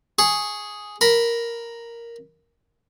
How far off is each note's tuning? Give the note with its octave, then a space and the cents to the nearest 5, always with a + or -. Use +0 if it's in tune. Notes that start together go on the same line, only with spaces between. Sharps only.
G#4 +0 C#6 +0
A#4 +0 B5 -5